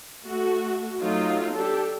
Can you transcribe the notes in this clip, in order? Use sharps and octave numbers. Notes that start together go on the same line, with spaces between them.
A3 F#4
F#3 A3 D#4 F4
D4 G4 A4